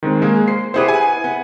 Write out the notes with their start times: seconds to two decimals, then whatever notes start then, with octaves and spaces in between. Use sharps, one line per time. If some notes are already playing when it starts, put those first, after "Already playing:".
0.03 D#3 G#3 C4
0.22 G#3 A#3 G#4
0.48 C5 C7
0.74 B3 E4 G4 G#4 B4 C5
0.88 G#5
1.24 B3